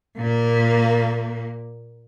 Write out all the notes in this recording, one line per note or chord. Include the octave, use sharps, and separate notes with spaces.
A#2 A#3